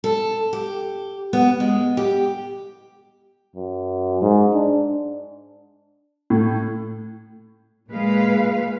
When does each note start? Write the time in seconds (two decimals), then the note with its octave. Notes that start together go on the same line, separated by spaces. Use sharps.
0.04 A4
0.53 G4
1.33 B3
1.60 G#3
1.97 G4
3.56 F#2
4.22 G#2
4.55 D4
6.30 A2
7.91 A#2 G#3 B4 F5